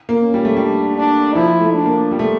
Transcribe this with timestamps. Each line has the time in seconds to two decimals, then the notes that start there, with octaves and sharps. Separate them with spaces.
0.09 A#3
0.21 C#4
0.34 G3
0.45 A3
0.57 G3 D4
0.98 D4
1.35 F3 E4
1.60 A3
1.74 D4
1.86 A#3
2.11 G3
2.19 A3